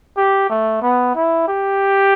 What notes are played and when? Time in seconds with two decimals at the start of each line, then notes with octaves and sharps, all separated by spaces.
0.17 G4
0.50 A3
0.82 B3
1.15 E4
1.49 G4